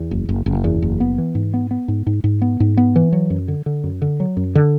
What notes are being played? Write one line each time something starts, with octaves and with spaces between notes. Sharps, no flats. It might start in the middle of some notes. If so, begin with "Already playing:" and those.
Already playing: E2
F#1
F#1
F#1
E2
F#1
B3
E3
G#2
B3
B3
G#2
G#2
G#2
B3
G#2
B3
E3
F#3
F#2
D3
D3
F#2
D3
F#3
F#2
D3